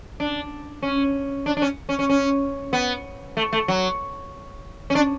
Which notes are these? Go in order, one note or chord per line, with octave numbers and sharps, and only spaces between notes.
D4
C#4
D4
D4
C#4
C#4
C#4
C#4
B3
A3
A3
F#3
C#4
D4